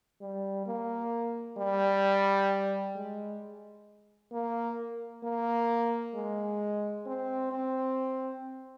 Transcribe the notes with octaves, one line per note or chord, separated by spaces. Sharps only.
G3
A#3
G3
G#3
A#3
A#3
G#3
C4
C4